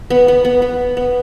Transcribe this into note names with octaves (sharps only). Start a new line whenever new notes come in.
B3
B3
B3
B3
B3